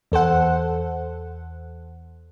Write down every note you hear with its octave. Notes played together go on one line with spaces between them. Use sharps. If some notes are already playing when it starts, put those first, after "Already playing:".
E2 A4 C5 F#5